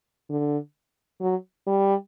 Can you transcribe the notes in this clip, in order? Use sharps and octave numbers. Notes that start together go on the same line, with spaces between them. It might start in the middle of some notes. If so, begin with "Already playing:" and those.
D3
F#3
G3